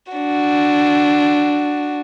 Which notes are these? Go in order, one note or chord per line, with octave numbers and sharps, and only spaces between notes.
D4 F#4